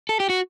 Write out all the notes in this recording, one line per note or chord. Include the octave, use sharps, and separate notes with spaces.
A4
G4
F#4